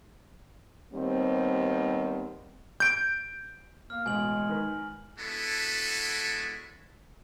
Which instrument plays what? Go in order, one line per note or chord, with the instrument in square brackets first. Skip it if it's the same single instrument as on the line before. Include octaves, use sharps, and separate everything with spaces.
[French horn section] D#2 G3 B3 C4
[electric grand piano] G6 D7
[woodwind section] A#3 [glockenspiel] F6
[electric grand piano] A1 B2 [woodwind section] G#3 [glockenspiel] G#5 F#7
[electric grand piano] D#3 A#4 B4
[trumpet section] G#3 B3 D4 E4 F#4 A4